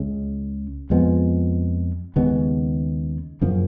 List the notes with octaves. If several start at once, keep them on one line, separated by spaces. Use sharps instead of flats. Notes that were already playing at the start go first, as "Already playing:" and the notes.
Already playing: C#2 C#3 G#3
F2 F3 G#3 B3
D#2 C#3 G#3 B3
F#2 C#3 F3 A#3